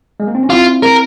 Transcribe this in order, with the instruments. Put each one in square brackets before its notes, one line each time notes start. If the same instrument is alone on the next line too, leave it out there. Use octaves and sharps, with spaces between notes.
[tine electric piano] G#3
A#3
C4
C#4
[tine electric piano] C4 E4 [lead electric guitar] F4
[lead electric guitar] A#4